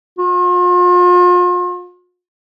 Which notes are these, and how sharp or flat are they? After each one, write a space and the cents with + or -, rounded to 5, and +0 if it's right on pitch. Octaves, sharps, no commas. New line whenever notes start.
F4 +40